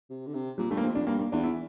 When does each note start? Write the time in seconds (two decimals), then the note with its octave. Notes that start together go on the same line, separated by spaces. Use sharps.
0.10 C3
0.27 D3
0.34 C3
0.58 A#2 G3
0.71 G2 A3
0.77 A#3
0.83 F2 C4
0.95 F2 D4
1.07 G2 A#3
1.19 A#3
1.32 E2 D4
1.44 E4